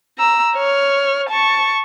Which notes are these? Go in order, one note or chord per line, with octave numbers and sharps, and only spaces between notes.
A#5 E6
C#5 F6
A5 C#6